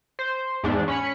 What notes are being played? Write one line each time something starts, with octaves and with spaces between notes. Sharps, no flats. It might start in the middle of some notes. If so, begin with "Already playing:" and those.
C5
E2 G#2 D4
C#4 B5 C#7